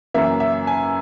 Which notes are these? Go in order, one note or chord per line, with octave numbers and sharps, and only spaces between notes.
F#2 C#3 E3 A#3 E5
E5
G#5